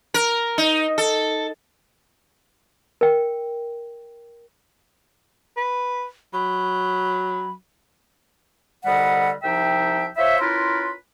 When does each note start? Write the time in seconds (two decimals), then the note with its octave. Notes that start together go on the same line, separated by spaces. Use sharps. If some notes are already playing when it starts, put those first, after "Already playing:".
0.14 A#4
0.58 D#4
0.98 A4
3.01 A#4 G5
5.57 B4
6.33 F#3 B5
8.85 C2 D3 G3 B4 D#5 F#5
9.43 C2 F3 D#4 E5 G5
10.17 F4 C5 C#5 E5
10.40 C#4 E4 F4 A#4 B4 C6